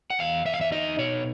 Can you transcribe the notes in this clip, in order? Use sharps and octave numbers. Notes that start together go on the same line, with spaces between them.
F#5
E2 F5
E2 E5
F5
E5
D#4 D#5
B2 C#5